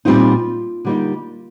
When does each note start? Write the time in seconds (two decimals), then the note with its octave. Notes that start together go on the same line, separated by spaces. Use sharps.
0.05 A#2 G3 C4 D#4 F4
0.85 D3 G3 A#3 D#4